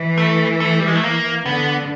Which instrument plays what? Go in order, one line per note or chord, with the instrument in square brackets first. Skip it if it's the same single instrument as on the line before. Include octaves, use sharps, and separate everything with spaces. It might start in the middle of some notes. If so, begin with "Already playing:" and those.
Already playing: [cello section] E3
[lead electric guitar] A3
A3
G3
G#3
A3
A#3
[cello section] D3 [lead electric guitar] B3